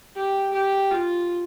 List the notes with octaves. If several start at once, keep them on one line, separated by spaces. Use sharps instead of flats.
G4
G4
F4